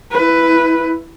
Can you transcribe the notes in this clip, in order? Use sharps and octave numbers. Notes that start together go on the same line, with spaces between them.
E4 B4